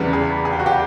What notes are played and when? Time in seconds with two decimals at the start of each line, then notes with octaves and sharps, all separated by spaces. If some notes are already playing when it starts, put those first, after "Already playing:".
Already playing: E2 C#3 E3 G3
0.13 G#4
0.45 G#4
0.52 G4
0.60 F#4
0.66 G4